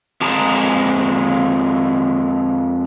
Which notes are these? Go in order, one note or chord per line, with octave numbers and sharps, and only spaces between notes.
F2 G#3 G#4 A5 A#5